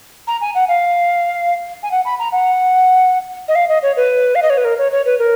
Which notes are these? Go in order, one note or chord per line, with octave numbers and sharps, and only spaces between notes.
A#5
G#5
F#5
F5
G#5
F#5
B5
A#5
F#5
D#5
F5
D#5
C#5
B4
F5
D#5
C#5
B4
A#4
C#5
C#5
B4
A#4